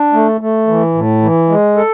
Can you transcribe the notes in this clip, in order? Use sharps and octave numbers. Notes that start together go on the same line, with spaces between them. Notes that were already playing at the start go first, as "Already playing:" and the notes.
Already playing: D4
A3
A3
E3
A2
E3
G#3
A4